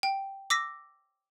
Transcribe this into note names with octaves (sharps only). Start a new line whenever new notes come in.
G5
D6 E6 A#6 B6